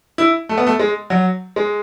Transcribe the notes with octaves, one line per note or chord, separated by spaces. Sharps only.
E4
A3
B3
A3
G#3
F#3
G#3